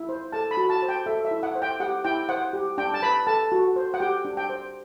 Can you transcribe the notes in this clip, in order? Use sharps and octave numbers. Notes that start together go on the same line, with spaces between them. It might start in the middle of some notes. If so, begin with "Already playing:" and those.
Already playing: E4
C5
A4 A5
B5
F#4
A5
C5
G5
A4 E5
E5
E4
F#5
C5
G5
G4 F#5
E4 G5
C5 F#5
G4
D4 G5
A5
B4 B5
A4 A5
F#4
C5
F#5
G4 G5
D4
G5
C5